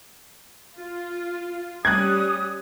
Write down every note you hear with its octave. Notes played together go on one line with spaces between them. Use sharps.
F4
G3 C#4 D#6 F#6 G#6